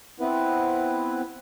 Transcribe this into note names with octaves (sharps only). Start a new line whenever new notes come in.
B3 C4 E4 B4